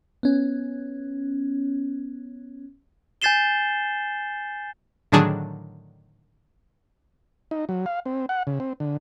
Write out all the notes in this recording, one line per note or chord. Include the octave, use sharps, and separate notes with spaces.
B3 C#4
G#5 G6 A6 C7 E7 G7
A2 D3 D#3 F#3 D4 G#4
D#4
F#3
F5
C4
F#5
C#3
C4
D3